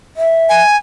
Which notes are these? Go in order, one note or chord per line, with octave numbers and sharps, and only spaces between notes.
E5
G#5